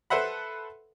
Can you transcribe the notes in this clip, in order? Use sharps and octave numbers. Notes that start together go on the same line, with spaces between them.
A4 B4 C5 E5 F#5 B5